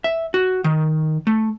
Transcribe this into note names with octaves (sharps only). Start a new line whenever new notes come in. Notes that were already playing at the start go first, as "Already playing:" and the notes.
E5
F#4
D#3
A3